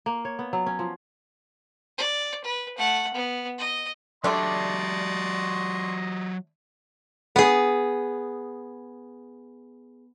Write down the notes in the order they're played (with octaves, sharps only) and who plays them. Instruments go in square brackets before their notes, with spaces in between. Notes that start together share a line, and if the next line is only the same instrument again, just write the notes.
[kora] A#3
C#5
B3
F#3
C#4
F3
[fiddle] D5
B4
A3 F#5
B3
D#5
[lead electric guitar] F#3 G4 [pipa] A3 D4 [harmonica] D5 C6 C#6 [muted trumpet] D#5
[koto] B3 G#4